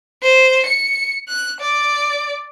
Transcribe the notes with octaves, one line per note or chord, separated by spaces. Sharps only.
C5
C#7
F#6
D5